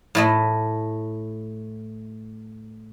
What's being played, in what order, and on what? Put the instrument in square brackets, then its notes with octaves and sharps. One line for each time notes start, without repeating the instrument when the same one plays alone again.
[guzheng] A2 A3 D#5